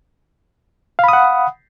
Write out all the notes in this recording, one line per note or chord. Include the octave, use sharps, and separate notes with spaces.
F5 F#5 B5 D#6